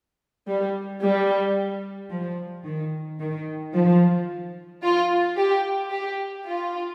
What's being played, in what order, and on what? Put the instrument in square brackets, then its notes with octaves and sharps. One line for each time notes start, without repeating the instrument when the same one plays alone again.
[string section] G3
G3
F3
D#3
D#3
F3
F4
G4
G4
F4